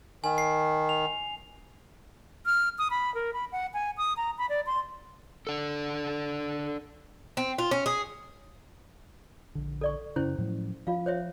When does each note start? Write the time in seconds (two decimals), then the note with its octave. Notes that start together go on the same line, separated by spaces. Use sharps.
0.24 D#3 G#5
0.38 C7
0.89 F7
2.46 F6
2.78 D#6
2.90 B5
3.15 A#4
3.34 B5
3.52 F#5
3.74 G#5
3.97 D#6
4.17 A#5
4.38 B5
4.49 D5
4.66 C6
5.47 D4 A4
7.37 C4
7.58 F4
7.71 C#4
7.86 G#4
9.55 A#1 D3
9.81 A4 D5 C#6
10.16 F#2 C#3 C#4 E4 C5
10.38 A2 F3 F#3
10.87 F3 F4 F5
11.06 C5 C#5 E5